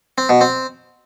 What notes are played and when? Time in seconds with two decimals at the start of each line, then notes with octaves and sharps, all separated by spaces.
0.18 C4
0.29 B2
0.41 C4